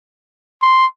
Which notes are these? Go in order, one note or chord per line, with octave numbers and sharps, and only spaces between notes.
C6